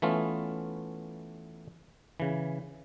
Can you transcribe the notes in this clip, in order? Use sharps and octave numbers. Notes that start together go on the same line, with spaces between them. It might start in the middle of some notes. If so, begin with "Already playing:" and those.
E3 A3 B3 C#4 F4
C#3 E3